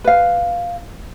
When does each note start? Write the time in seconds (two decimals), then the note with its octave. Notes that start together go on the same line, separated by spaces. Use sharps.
0.04 B4 F5